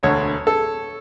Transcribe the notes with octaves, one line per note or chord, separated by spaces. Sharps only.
E1 D2 D3 C#5
A4